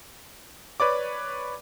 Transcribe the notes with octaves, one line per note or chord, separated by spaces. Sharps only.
B4 C#5 D5 D6